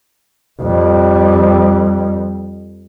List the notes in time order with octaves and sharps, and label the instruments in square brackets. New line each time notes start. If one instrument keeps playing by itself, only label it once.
[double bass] F2 G3